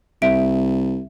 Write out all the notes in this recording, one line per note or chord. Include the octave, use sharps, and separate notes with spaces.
C2 E5 D7